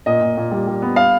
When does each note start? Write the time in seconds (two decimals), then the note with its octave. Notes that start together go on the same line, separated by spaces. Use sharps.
0.06 A#2 D#5
0.21 A#2
0.37 A#2
0.51 G3
0.67 G3
0.82 B3
0.96 F5